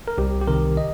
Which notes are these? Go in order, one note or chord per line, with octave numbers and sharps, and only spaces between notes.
A#4
C2 G4
G4
C3 D#3 A#4
D#5